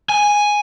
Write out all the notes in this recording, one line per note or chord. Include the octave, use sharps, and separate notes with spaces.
G#5